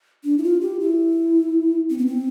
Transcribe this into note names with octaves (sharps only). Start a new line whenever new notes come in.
D4
E4
F4
G4
E4
C4
B3
C4